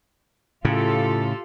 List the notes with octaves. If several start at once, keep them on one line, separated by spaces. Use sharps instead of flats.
A2 C#3 F4 G4 A4